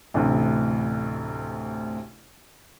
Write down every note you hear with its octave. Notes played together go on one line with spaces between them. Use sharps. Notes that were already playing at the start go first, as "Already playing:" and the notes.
A1 D2 C3